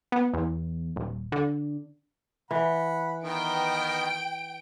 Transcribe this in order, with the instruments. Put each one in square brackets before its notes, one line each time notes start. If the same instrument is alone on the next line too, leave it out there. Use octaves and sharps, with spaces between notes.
[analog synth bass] B3
E2
D#1
D3
[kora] E3 [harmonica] F#5 B5
[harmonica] D#3 B3 D#4 [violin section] G5 D7